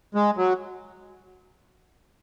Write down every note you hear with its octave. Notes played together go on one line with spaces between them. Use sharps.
G#3
F#3